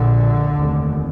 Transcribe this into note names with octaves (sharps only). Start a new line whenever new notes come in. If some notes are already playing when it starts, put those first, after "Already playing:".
Already playing: A#1 A#2 D3
F1 D#2